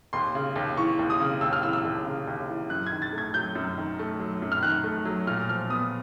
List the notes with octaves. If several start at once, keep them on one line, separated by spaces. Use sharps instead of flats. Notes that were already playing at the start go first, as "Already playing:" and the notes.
D#2 C6
C#3
D#2
E3 C#6
D#2
D#6
C#3
D#2 E6
F6
E3 E6
E6
D#2
C#3
D#2
E3
F#2 F#6
G#6
D#3
A6
A3
G#6
F#3 G6
F#2
D#3
A3
F#3
F#2
F6
D#3 F#6
A3
F#3
A#2 F6
F3 F6
B3 D#6